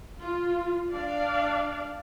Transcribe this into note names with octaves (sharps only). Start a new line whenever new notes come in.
F4
D4 D5 F5